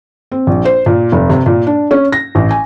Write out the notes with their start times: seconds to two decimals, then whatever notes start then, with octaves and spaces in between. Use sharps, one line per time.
0.32 C4
0.47 A#1
0.65 C5
0.86 A#2
1.12 F1
1.29 C3
1.46 A#2
1.67 D4
1.91 C#4
2.12 A#6
2.35 A1
2.51 G#5